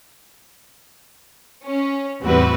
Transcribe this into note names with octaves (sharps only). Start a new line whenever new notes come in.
C#4
E2 A2 G3 C4 F#4 B4